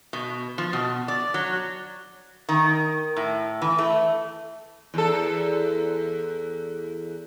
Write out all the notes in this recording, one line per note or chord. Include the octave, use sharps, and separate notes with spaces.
B2
F3
B2
D5
F#3
D#3
A2
E3
A3
E2 A4